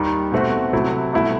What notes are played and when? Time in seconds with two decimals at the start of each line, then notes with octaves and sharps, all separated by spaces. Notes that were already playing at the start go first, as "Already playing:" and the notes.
Already playing: D#2 D#3 G3
0.32 B2 A3 C4 F#4
0.73 C3 F#3 A3 E4
1.13 C2 B2 A3 E4